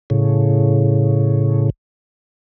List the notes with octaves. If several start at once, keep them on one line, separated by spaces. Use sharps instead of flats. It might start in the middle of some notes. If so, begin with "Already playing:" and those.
A2 C#3